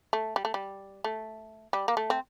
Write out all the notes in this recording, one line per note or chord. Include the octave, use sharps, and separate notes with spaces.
A3
G3
A3
G3
A3
G3
A#3
A3
C4